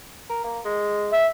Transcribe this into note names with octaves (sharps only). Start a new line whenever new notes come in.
A#4
A#3
G#3
E5